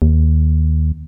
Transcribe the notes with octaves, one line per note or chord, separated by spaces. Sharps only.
D#2